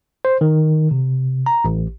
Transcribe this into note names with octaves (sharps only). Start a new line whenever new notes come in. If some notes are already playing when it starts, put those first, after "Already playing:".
C5
D#3
C3
A#5
A1